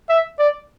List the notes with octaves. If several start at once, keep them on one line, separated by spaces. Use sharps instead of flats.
E5
D5